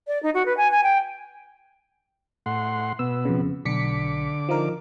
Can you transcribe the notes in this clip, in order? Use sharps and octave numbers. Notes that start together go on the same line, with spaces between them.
D5
D#4
F#4
B4
G#5
G#5
G5
A2 F#5 C6
B2 B3 E6
F2 C#3
B1 D3 D6 B6 C#7
F3 D#4 A#4